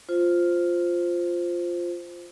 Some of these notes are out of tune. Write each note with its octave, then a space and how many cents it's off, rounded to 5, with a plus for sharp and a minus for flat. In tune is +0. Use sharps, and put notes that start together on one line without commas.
F4 +0 C5 -5